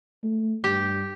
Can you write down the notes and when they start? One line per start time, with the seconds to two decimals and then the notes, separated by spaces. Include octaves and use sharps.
0.24 A3
0.64 G2 G4